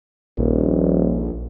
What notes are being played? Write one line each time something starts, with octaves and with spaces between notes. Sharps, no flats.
D#1 A#1